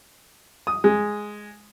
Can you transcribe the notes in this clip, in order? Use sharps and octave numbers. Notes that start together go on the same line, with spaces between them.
D#6
G#3